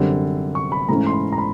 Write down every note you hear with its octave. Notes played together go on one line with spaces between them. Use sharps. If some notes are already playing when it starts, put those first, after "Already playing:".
Already playing: F#2 D3 G3 C4
C#6
B5
G#2 E3 A3 C#4 A#5
C6
B5
A#5
B5